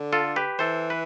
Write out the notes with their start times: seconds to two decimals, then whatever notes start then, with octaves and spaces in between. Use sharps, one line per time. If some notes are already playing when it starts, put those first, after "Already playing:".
Already playing: D3
0.13 F4 A4
0.36 G4 B4
0.59 E3 A4 C5
0.90 B4